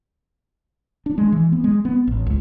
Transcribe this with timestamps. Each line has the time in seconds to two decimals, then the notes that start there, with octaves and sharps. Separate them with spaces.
1.06 D4
1.18 G#3
1.32 E3
1.52 B3
1.64 G#3
1.85 B3
2.08 A1
2.27 C#2